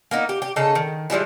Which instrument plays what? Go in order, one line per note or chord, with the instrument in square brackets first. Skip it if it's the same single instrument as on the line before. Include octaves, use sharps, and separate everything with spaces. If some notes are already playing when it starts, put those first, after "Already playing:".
[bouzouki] A#3 B3 D#4
G4
G4
C#3 D#4 A4
D#3
F3 G3 G#3 E4